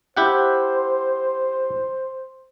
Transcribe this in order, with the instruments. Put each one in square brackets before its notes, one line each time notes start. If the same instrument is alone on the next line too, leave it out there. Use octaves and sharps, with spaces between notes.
[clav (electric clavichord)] E4 G4 F#5 [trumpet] C5